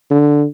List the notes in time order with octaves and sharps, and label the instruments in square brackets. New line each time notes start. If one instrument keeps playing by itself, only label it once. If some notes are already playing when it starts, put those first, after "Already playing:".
[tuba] D3